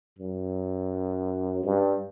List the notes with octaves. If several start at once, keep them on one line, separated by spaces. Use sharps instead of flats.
F#2
G2